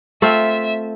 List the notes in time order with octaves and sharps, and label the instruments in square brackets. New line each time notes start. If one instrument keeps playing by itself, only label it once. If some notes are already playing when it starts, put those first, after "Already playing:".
[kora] A3 C4 F4 [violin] E5